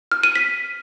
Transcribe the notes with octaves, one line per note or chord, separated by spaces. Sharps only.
F6
D#7
B6